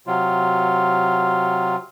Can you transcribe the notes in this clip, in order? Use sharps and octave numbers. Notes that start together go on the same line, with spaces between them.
C3 F#3 F4